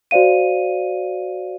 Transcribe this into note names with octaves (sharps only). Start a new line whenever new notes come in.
F#4 C5 D5 F5 D#7